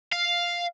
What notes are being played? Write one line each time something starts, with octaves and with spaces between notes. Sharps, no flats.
F5